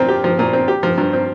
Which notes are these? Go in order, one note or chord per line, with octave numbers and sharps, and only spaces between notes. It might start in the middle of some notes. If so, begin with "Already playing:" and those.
Already playing: A#2 F3 C4
G4
F3
A#2
C4
G4
F3
G2
C4